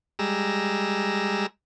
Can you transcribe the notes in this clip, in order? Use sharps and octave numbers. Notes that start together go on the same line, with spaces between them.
G3 G#3 A#5 E6